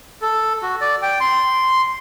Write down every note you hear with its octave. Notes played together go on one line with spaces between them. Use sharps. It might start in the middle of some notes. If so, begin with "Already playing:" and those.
A4
F#4
D5
G5
C6